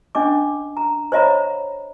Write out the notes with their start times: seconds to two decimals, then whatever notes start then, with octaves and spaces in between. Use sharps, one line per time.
0.15 C#4 D4 D#5 D6
0.77 A#5
1.12 C5 C#5 D#5 F5 A#5 B5